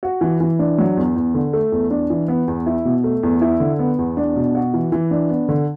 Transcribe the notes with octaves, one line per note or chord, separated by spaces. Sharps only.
F#4
E3
E3
D4
F#3
E2
E2
D3
A3
E2
D4
E3
B3
E2
E4
B2
A3
E2
E4
D3
B3
E2
D4
B2
F#4
E3
E3
D4
B3
D3